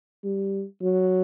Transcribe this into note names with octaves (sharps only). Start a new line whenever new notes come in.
G3
F#3